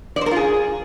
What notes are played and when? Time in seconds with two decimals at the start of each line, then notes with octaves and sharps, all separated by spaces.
0.16 D5
0.21 C5
0.26 A#4
0.31 F4
0.36 G#4